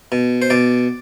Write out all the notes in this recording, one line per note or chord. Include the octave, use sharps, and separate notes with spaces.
B2
C5
B2 D5